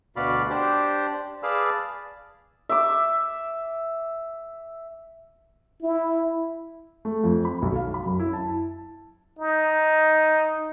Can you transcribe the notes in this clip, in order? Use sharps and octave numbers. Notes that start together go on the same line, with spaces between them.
D2 B2 F#4 D5 F5 B5
D4 G4 C5 D5
G#4 B4 D5 F5 A5 E6
E5 D6
E4
A3
F2
B5
B1
F5
B5
F#2
E4
A5
D#4